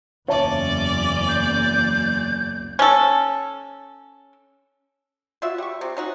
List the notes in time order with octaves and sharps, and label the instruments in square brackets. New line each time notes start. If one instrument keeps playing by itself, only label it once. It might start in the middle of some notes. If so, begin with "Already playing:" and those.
[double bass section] F#1 E2 [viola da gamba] C#4 D5 [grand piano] C#5 E5 A5
[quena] G6
[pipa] C#4 A4
F4 F#4 E5
G3 C#6
C3
C#4 D#4 F#4